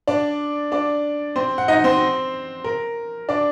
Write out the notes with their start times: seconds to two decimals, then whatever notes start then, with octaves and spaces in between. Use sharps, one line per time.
0.08 D4 D5
0.72 D4 D5
1.36 C4 C5
1.58 F#5
1.68 D#4 D#5
1.84 C4 C5
2.64 A#4
3.29 D4 D5